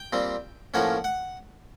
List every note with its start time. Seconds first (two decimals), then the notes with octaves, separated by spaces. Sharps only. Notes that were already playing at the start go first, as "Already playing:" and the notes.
Already playing: G5
0.13 A#2 G3 C4
0.74 A2 F3 A#3 C#4 F#5
1.04 F#5